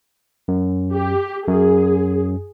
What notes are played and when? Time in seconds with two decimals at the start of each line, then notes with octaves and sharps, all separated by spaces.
0.48 F#2
0.92 G4
1.47 F#2 G#4